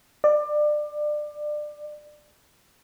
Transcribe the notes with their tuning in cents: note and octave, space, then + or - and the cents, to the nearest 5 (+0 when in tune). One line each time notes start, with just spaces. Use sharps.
D5 +25